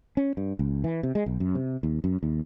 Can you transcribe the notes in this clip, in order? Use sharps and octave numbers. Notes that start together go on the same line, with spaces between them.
C#4
G2
C#2
E3
C3
G#3
B1
F#2
C3
D#2
F#2
D#2